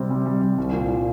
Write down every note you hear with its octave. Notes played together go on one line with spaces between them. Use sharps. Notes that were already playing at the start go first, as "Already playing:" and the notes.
Already playing: C3 G3 C4
G3
G3
G3
C2
A#2
A#2